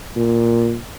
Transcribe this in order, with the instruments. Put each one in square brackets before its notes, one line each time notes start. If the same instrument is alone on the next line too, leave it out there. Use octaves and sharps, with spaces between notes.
[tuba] A#2